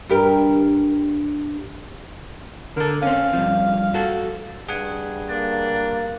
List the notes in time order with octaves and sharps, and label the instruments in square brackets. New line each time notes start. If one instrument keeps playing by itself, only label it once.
[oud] G2 G4 A#4
[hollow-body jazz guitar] D3 A4 [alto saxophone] A#4
[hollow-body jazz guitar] C4 C#4 [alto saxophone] F5
[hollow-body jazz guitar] G2 F3
F#4 A4
[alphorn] G2 [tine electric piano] G#4 F#5 G#5
[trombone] A#3 [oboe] D4